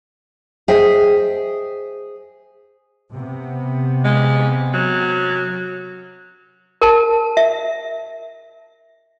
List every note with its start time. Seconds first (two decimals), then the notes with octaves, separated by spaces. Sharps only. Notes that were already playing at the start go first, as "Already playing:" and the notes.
0.68 G#4 C5 D#5 E5 G5
3.12 C3 B3
4.05 G#3
4.74 F#3
6.82 A#4 A5
7.37 E5